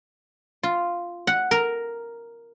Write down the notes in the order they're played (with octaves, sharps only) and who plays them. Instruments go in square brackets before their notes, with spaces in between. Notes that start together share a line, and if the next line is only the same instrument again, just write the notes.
[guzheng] F4
F#5
A#4